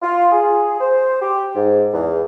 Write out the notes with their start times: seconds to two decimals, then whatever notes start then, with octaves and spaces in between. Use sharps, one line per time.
0.03 F4
0.32 G#4
0.81 C5
1.22 G4
1.56 G#2
1.93 E2